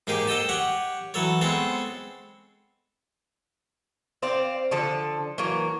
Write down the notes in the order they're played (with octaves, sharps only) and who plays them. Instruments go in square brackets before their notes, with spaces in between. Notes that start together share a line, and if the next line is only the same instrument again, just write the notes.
[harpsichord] G#2 A#3 D#4 G4 G#4
A4 D#5 G5 A5
G4 C#5 F#5
E3 F#3 A4 C#5
G#3 B3 C4 A4 C#5
[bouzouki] C4 C5 D5 F5
D3 F3 A4
E3 F#3 A#3